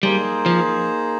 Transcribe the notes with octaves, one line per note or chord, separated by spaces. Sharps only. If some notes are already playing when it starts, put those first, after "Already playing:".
G3 A#3 D#4 G#4 C5
F3